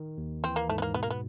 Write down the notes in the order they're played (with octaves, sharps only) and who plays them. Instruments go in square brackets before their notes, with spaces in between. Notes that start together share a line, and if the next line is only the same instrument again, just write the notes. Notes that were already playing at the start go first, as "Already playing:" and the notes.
Already playing: [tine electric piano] D#3
D#2
[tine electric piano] E3 [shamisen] C4
[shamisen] A#3
[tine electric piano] G#2 [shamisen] A3
[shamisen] B3
A#3
[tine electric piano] B2 [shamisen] B3
[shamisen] A#3
B3